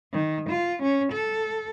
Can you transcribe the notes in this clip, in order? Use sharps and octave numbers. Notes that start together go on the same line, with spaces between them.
D#3
F4
C#4
A4